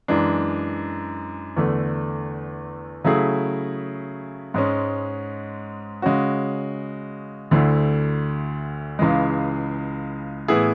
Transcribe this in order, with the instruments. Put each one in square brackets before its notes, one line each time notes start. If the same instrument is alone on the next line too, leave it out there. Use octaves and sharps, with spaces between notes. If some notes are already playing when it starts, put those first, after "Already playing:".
[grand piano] F#2 E3 G#3 D4
E2 D3 A3
C#3 F#3 A3 E4 G#4
G#2 G#3 C#4
C#3 G#3 C#4 F#4
D2 D3 A3 E4
C#2 C#3 E3 G#3
A2 E3 B3 E4 G#4